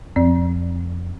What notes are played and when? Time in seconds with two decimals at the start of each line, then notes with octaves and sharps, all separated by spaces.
0.16 F2 F3 C4 D5